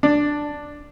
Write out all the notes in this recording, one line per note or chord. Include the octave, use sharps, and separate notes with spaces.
D4